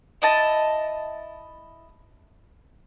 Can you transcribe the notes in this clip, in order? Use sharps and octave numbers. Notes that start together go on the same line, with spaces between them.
E4 D#5 A5